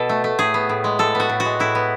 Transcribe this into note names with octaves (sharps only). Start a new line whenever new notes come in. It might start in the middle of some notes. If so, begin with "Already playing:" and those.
Already playing: B2 A4
A3
A3
A2 G#4
B3
A2
G#3
A2 A4
B3 F#4
A2
F#4
G#3
A2 E4
B3